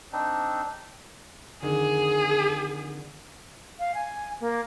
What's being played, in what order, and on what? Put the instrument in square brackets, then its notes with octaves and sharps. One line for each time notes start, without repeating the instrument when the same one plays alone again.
[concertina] C4 D4 D#4
[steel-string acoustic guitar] F2 D3 D#3 [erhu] G#4
[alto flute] F5
G#5
A#3